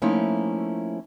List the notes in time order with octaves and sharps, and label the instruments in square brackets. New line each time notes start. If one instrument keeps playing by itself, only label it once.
[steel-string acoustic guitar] F3 A3 A#3 C#4 D#4 E4